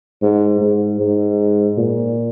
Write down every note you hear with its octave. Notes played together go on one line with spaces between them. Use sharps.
G#2
G#2
G#2
A#2